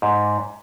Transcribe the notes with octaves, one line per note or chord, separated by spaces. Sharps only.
G#2